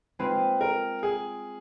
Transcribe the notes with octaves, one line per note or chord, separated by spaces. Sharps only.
G#3 C4 F4 B4
A#4
G#4